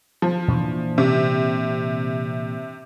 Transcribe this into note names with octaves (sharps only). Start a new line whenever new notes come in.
F3
A#2 E3 D4
C3